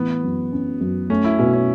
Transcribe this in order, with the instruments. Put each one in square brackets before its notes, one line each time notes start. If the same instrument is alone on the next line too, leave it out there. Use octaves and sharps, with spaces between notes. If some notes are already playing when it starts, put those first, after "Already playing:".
Already playing: [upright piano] A2 E3 [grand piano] B3
[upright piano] F#2
C#4
F#2
[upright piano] A3 [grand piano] C#4
[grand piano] E4
[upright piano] B2 [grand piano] C#4
[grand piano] C#4